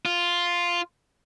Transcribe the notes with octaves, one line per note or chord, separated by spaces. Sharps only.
F4